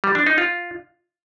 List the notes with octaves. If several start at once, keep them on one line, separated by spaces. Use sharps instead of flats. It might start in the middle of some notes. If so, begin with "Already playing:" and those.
G3
D4
D#4
F4